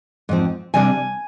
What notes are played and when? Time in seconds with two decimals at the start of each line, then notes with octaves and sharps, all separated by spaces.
0.29 G#2 F3 C4
0.74 C3 G3 D4 G#5